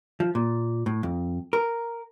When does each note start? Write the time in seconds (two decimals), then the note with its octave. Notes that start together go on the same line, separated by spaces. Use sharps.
0.20 F3
0.35 A#2
0.86 A2
1.03 F2
1.53 A#4